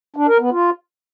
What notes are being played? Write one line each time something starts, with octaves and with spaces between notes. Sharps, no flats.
D4
A#4
B3
F4